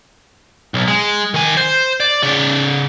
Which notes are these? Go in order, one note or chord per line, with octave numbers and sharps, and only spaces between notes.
B1
G#3
D#3 G#5
C5
D5
C#3 D5